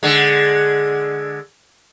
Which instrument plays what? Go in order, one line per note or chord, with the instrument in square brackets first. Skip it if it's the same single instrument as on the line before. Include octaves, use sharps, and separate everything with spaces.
[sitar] D3 G#3